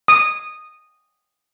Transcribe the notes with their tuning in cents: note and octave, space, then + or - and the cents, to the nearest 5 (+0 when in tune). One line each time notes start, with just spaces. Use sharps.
D#6 -10